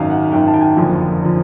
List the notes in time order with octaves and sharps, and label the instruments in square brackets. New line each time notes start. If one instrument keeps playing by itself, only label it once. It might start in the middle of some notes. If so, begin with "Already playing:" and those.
Already playing: [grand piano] G#1 F#2 D#3 F5
F#5
G#1 F#2 D#3 G5
A5
G5
G#5
F#1 F2 D3 F3
D3 F3